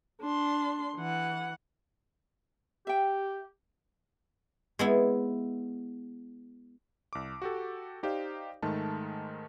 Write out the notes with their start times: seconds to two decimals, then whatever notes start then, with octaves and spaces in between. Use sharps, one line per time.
0.22 D4 C6
0.97 E3 F#5
2.87 G4 E5 G5
4.79 G#3 B3 E4
7.13 C2 D6
7.42 F#4 G4 A4
8.03 D#4 G4 C5 D5 F5
8.62 G#2 D#3 G#3 A3 A5